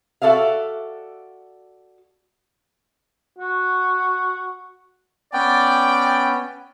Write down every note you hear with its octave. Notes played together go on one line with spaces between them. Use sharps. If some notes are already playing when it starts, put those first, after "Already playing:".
F#4 A4 D5 E5 F5
F#4
B3 C#4 D5 G5